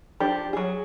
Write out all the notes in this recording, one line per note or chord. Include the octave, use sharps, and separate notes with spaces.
F3 D4 G4
F#3 G#4